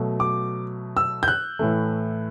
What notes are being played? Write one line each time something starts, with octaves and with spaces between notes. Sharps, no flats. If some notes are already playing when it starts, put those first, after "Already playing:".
Already playing: B2 F#3 A3
D6
E6
G6
F#6
A2 E3 A3